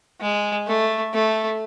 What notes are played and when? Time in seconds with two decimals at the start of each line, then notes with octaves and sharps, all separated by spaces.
0.21 G#3
0.67 A3
1.14 A3